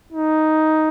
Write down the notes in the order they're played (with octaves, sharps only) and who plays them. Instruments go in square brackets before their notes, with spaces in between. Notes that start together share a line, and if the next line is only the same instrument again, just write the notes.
[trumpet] D#4